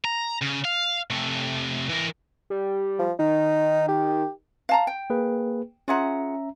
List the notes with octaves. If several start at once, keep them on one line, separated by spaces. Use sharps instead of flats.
A#5
C#3
F5
C3 A3
E3 A#4
G3
F3
D#3 D#4
G4
F5 A5 A#5
G5
A#3 G#4 B4
C#4 F4 G#4 E5 F#5 A#5